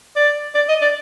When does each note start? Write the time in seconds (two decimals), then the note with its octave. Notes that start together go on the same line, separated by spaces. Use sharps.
0.16 D5
0.55 D5
0.69 D#5
0.82 D5